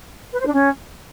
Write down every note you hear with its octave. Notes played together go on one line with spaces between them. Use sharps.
B4
C5
D4
C#4